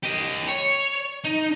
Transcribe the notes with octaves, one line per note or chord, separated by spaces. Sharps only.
G4 D#5
C#5
D#4